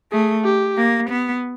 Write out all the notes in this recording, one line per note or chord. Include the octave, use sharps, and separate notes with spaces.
A3 G#4
G4
A#3
B3